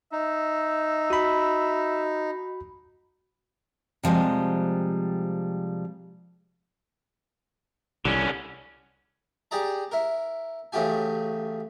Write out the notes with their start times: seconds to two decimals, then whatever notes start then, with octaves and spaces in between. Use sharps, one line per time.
0.12 D#4 E5
1.10 F#4 B5
4.03 C3 F3 G3 G#3
8.05 C2 D3 C#4
9.51 G4 G#4 D5 A#5
9.91 E4 A#4
10.72 A1 C#3 A3 F#4 G4 G#5